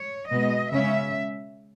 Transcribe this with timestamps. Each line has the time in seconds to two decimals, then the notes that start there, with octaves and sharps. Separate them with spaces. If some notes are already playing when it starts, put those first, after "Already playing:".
Already playing: C#5
0.31 B2 G#3 B3 D#5
0.73 C#3 G#3 C#4 E5